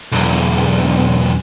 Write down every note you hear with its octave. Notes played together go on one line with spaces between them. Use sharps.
B1 E2